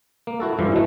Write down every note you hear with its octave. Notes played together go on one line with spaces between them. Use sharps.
A#3
E4 F#4 A4
G2 E3 F3
E3 A3 E4 F#4 D#5